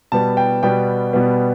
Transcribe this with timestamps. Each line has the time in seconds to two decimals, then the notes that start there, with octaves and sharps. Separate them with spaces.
0.12 B2 G3 B3 A5
0.37 G5
0.63 B2 G3 B3 G5
1.13 B2 G3 B3